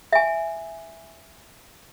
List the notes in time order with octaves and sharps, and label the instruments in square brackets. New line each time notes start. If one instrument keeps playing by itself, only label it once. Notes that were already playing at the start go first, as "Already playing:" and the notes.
[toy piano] E5 G#5